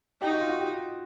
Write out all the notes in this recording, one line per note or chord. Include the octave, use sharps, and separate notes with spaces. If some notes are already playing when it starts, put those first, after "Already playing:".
D#4 G4
F#4
F4
F#4
G4